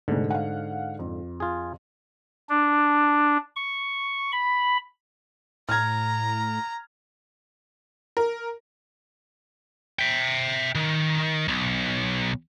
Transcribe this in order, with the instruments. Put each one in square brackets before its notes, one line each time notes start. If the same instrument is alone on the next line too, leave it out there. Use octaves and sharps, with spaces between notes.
[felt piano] F1 G#4 [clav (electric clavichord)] G#2 D3
[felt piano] F5 F#5
F2
[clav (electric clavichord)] F4 G#4
[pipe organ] D4
C#6
B5
[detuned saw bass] A2 [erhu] A#5 [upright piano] F6 G#6
[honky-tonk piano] A#4
[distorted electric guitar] E5 G5
D#3
B1